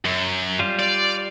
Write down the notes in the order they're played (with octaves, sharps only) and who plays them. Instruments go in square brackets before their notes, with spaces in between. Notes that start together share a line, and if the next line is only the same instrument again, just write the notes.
[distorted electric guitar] F#2
[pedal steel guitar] G3 F4
[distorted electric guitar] D5